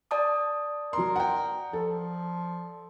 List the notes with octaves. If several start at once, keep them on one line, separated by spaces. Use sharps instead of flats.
D5 A5 D#6
F#3 A#4 C6
F#5 G5
F3 A4